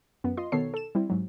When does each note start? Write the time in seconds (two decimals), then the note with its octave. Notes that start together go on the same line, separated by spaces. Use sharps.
0.24 F#2 B3
0.37 F4 D#5 C6
0.52 B2 D#3 B3 A4 C#5 C7
0.74 A4 E7
0.95 G3 C4 E4
1.10 G#2 F#3